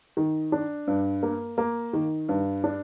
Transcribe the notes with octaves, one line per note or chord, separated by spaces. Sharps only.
D#3
D4
G2
A#3
A#3
D#3
G2
D4